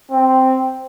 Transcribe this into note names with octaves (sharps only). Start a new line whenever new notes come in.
C4